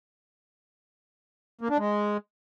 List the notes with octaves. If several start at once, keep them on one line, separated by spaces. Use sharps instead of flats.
A#3
D4
G#3